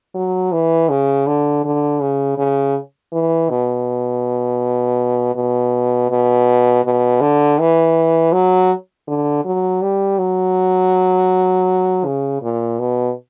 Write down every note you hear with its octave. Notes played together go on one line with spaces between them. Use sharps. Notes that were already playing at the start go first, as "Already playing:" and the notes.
F#3
E3
C#3
D3
D3
C#3
C#3
E3
B2
B2
B2
B2
D3
E3
F#3
D3
F#3
G3
F#3
C#3
A#2
B2